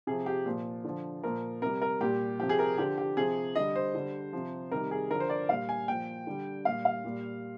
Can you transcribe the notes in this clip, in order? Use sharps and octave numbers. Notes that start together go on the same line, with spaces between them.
C3 F3 G#4
G4
A#2 F3
D3 F3
A#2 F3 A#4
C3 G3 A#4
A#4
A#2 G3 G4
C3 F3 G4
G#4
A#4
D3 F3 G4
G4
C3 F3 G#4
D3 G3 D#5
C5
D3 G3
C3 F3
C3 D#3 G3 A#4
G#4
D3 F3 A#4
C5
D5
A#2 G3 F5
G#5
A#2 F3 G5
D3 G3
A#2 G3 F5
F5
A#2 G3